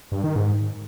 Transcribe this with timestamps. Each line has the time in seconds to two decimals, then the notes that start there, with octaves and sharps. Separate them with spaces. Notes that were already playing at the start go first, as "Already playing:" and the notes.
0.12 G2
0.24 D#3
0.36 G#2